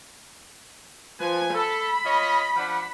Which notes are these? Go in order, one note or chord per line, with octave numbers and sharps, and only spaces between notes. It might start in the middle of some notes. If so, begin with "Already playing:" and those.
F3 B4 G#5
A4 B5
F4 C#5 D#5
F3 D4 F#5